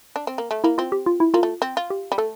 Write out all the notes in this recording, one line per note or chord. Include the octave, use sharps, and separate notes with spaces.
D4
C4
A#3
A3
A#3 E4
C4 F4
G4
F4
E4
A#3 F4
A3
C4
F4
G4
G3
A3 A4